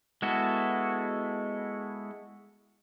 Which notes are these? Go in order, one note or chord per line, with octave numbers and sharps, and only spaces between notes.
G#3 B3 E4 F#4 A4